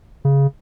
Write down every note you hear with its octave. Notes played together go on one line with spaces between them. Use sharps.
C#3